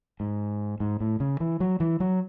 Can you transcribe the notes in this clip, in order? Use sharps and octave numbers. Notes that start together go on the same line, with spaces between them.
G#2
G#2
A2
C#3
E3
F#3
E3
F#3